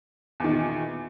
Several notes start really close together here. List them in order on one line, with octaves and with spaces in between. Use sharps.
E2 D#3 A#2